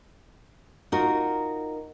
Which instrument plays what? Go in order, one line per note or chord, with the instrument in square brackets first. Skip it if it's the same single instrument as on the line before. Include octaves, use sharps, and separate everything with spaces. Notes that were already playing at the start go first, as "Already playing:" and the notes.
[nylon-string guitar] D#4 F4 F#4 A#4